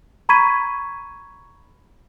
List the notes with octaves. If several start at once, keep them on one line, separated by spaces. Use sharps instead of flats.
A#5 B5 C#6 G#6 B6 D#7